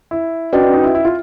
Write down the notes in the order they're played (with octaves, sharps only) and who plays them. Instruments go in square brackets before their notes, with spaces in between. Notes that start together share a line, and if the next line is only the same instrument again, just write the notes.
[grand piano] E4
[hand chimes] C#4 F#4 B4 D#5 G5 [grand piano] D4
[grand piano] D4
D#4
E4
E4
F4